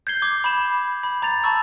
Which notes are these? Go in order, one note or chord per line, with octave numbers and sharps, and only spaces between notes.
G6 G#6 C7 G7
D6
B5 E7
B5
A#5 A6 F7
A5 B5 C#6 E6